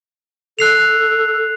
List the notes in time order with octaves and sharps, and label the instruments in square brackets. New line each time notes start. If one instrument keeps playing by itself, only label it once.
[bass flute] A4 [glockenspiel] F#6 C7 F7